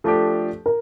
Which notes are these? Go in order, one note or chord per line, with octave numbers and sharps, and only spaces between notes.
F3 A3 D4 G4 A4
A#4